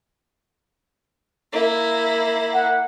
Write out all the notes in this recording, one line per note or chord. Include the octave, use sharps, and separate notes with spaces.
A#3 E4
F#5